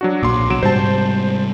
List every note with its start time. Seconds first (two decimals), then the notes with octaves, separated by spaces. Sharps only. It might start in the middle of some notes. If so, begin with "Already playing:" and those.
0.01 F#3 D4 F#4
0.23 B1 A#2 C6 D6
0.50 B2 F#3 D7 E7
0.63 G#2 C3 G3 C5 A5